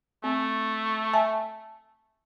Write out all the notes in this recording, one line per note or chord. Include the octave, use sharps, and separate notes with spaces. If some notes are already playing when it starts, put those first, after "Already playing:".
A3 C4
E5 G#5 A5